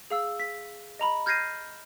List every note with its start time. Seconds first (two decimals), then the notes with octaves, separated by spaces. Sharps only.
0.11 G#4 F5 E6
0.40 B6
0.99 D#5 A#5 B5
1.26 F6 G6 G#6 A#6 C7 D#7